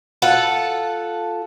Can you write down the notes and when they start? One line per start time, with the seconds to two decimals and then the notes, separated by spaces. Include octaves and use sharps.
0.22 F4 A4 F#5